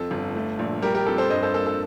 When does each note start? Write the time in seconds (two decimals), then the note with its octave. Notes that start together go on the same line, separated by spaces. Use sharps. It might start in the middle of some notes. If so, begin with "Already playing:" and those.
Already playing: F2 A4
0.11 G1
0.36 A3
0.59 A#1
0.82 G3 G4 A#4
0.95 G4 A#4
1.06 F2 A4
1.18 A4 C5
1.30 G2 C5 D#5
1.42 A4 C5
1.54 A#3 A4
1.66 A4